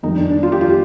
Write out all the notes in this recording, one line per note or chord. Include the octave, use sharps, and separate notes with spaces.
F2 D#3 G3 D#4
D4
D4
F4
G4
F4
G4